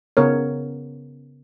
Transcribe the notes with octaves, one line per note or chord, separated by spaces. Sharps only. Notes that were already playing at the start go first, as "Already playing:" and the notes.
C#3 B3 A#4 C#5